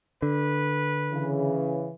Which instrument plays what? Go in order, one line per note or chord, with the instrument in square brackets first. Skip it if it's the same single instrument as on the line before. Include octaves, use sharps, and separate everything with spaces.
[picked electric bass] D3 [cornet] B4
[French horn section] C#3 E3